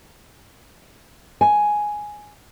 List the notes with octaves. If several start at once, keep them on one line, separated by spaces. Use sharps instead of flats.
G#5